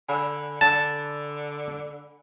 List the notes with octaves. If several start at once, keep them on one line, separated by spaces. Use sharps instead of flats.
D3 G#5 B5
D3 A5